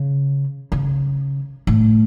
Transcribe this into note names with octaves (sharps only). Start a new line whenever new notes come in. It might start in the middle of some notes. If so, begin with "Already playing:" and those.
Already playing: C#3
C#3
A2